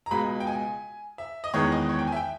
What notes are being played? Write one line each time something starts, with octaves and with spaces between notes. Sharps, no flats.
A#5
C#2 B2 G#3 B5
G5
G#5
E5
D#5
E2 D#3 G#3 B3 C#5
D#5
C#5
G5
G#5
E5
G5